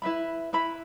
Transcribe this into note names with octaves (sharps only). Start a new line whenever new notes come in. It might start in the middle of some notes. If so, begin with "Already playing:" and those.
E4 B4 E5 B5
E4 B4 E5 B5